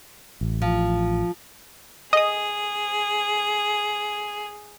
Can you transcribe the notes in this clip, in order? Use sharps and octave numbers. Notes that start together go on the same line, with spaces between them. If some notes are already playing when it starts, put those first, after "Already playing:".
A1
F3
G#4 D#5 D#6